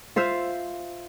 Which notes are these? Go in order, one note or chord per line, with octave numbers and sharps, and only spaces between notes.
F4 C5 E5 F5